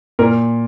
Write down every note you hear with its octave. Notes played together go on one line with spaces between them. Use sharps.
A#2 A#4